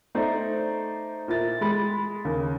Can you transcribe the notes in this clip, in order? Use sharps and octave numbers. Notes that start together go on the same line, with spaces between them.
A3 D#4 C5 D5
A#2 E4 A6
G#3 B5 A6
D#2 C#3